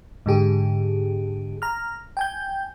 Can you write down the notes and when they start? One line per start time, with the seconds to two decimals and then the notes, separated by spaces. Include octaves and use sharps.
0.26 G#2 D3 G4 G#4
1.62 A#5 F6
2.17 G5 G#5 G6